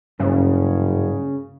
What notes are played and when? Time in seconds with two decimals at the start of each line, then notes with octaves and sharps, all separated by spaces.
0.19 F#1 G2 C#3